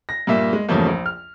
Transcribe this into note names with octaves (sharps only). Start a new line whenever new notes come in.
A#6
G2 A#2 A#3 E5
G#3
E2 G2 C#3 F3 A3 A#3
A#1
F6